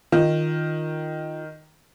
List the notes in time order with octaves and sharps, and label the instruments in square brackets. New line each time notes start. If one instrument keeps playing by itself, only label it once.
[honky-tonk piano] D#3 [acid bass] F4